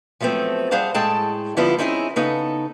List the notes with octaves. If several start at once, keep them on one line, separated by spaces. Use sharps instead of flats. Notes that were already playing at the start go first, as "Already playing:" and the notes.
F3 F#3 A3 B3 C4
G3 G#4 C5 F5 F#5 A5
A2 G#3 G#4 A4 G5 A5
D3 F3 G3 B3 E4 F4
C4 C#4 D#4 E4 G4 G#4
C#3 B3 D#4 A4